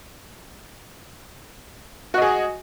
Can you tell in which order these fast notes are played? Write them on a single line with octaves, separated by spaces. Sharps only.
F#4 D#5 G#4